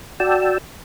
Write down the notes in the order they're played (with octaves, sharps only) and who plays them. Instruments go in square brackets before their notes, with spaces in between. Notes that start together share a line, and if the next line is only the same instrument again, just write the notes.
[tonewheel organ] F#4 D5 G5 A5 E6